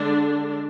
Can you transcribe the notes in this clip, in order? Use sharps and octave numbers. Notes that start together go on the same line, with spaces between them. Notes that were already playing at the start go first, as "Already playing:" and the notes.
Already playing: D3 G#3 D4